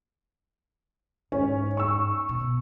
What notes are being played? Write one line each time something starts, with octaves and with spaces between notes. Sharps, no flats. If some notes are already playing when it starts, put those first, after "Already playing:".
G#2 C#4
C#6 E6
B2